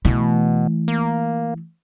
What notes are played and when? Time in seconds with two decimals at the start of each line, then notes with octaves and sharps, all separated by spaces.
0.05 B2 E3 A3
0.88 A#3